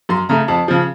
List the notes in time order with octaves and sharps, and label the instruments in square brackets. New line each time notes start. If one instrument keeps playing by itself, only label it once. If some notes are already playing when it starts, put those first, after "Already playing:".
[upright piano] F#2 C6
C#3 A3 A#5
F2 A5
C#3 F3